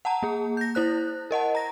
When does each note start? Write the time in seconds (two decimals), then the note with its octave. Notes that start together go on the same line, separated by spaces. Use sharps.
0.05 F#5 A5 A#5
0.23 A#3 G#4
0.57 G6 A#6
0.75 E4 C5 F#6
1.31 A#4 D#5 F#5 A5
1.55 A#5 A#6